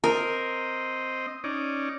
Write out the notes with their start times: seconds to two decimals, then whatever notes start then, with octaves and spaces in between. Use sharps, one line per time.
0.04 C4 A#4 D#5
1.44 C#4 D#4 D5